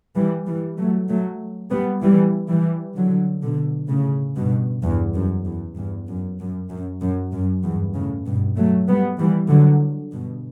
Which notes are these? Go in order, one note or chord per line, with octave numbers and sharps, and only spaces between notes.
E3 G3
E3 G3
F#3 A3
F#3 A3
G3 B3
E3 G3
E3 G3
D3 F#3
B2 D3
A2 C#3
G2 B2
E2 G2
F#2
E2
E2 G2
F#2
F#2
F#2
F#2
F#2
E2 G2
A2 C#3
G2 B2
F#3 A3
G3 B3
E3 G3
D3 F#3
G2 B2